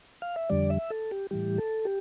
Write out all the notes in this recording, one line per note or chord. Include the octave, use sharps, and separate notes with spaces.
F5
E5
F2 D3 G3 D5
E5
A4
G4
A2 E3 G3 G4
A4
G4